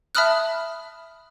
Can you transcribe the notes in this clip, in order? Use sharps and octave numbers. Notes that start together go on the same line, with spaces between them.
E5 A5 B5 D#6 F6 F#6